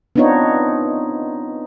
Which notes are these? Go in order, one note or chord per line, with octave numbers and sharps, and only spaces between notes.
B3 C4 D4 D#4 F4 C#5